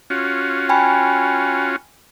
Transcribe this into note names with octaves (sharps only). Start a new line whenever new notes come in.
C#4 F4 F#4
G5 G#5 B5